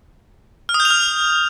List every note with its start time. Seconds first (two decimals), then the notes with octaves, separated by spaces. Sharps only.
0.69 F6
0.74 D#6
0.80 G6
0.85 F7
0.90 F6